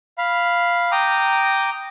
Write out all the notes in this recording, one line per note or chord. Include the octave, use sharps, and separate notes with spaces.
F5 B5
G5 A#5 D6 D#6